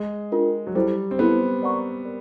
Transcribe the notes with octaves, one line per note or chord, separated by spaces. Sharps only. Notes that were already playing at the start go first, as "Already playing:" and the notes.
Already playing: G#3
D4 F4 A#4
F#3
G3 E4 A4 C5
C4
B3 E4 A4 C5
A#4 D5 F#5 A#5 C#6
A#4 D5